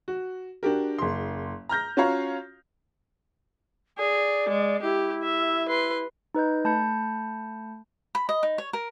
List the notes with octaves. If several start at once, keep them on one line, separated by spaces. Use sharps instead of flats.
F#4
D4 F#4 G4 A#4
F#1 C6
A#5 F6 G6 A#6
C#4 F4 F#4 C#5 F5 A#5
G#4 D5
G#3
E4 G4
E5
B4 C6
D#4 B4 D#5 G6
A3 A5 B5 G6 C#7
B5
D#5
D#4
C#5
A#4